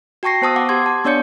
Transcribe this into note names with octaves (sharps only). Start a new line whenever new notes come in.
F#4 G5 A5 C#6 A#6 C7
B3 C5 A5 D#6 E6
F#5 D6
G4 C6 G#6
A5
B3 D4 C#5 D5 G6 C#7